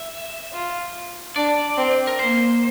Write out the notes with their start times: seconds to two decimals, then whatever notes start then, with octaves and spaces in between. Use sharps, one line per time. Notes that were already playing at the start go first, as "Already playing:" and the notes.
Already playing: E5
0.52 F4
1.35 D4 D5
1.77 C4
2.07 A#4
2.19 A#3 C5